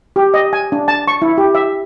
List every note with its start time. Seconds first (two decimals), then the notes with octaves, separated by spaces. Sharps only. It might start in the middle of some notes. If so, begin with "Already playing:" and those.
0.16 G4
0.34 D#5
0.53 G#5
0.72 D4
0.88 A5
1.08 C#6
1.22 E4
1.38 G4
1.55 E5